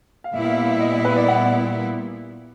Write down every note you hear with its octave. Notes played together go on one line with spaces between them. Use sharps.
F5
A#2 G3 B3 E4 E5
F5
E5
F5
E5
D#5
D#5
B4
D5
F#5